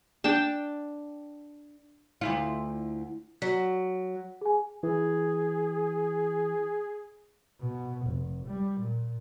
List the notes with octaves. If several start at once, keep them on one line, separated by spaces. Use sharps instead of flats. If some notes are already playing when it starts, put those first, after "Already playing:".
D4 G5 A5
D2 E4 F4
F#3 B6
G#4 G#5
E3 G#4
B2
F1
G3
A#2